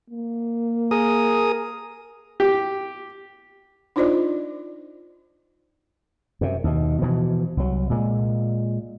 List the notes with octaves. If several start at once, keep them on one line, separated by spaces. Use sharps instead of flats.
A#3
G#4 A#4 D#6
G4
D4 D#4 F4 C5 D5 D#5
F#2 C3
D#2 B2
B2 E3 F3
C2 F#3
A#2 G#3